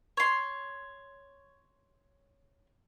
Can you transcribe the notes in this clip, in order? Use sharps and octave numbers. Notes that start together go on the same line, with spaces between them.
C#5 C6